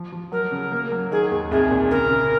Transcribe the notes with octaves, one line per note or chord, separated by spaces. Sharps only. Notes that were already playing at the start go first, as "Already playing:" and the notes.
Already playing: F3
F3
F#3 A#4
C#3
A#3
F#3
D#3 G#4
D#2
C2 G#4
A#2
C#3 A#4
C#3